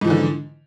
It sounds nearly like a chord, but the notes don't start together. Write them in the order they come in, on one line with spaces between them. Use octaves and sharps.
G#2 F3 E3 D3